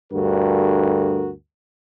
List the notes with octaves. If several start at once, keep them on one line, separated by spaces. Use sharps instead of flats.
D2 G2 F#4 A4 A#4